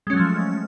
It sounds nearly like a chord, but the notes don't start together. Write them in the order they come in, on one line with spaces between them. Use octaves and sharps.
G#3 C#4 F#3 A3 F3